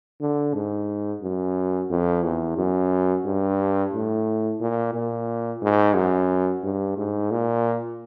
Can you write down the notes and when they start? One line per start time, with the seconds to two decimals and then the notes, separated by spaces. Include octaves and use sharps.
0.21 D3
0.54 G#2
1.23 F#2
1.90 F2
2.24 E2
2.58 F#2
3.25 G2
3.93 A2
4.61 A#2
4.94 A#2
5.62 G#2
5.96 F#2
6.63 G2
6.98 G#2
7.31 A#2